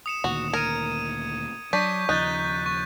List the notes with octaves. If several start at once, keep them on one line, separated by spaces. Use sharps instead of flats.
D#6 C#7 E7
D2 A#2 D#3 F#4
A#4 G#6 D#7
F#3 D4 C#6 G6 B6
D#2 C#3 F3 D#4 F#6 G6 A6
C#6